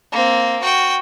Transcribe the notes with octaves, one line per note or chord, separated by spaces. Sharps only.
A#3 C4
F#4 G5